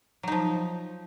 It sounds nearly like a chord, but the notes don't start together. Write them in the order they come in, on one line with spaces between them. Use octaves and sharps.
F#3 D#4 F3